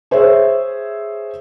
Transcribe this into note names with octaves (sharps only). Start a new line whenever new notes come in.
G#4 C5 C#5 E5